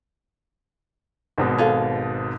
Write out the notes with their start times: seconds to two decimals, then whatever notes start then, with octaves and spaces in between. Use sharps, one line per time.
1.38 G#1 G#2 B2
1.58 G#4 A4 F5